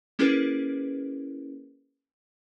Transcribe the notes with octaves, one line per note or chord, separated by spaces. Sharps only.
A#3 C#4 E4 G#4 A#4 B4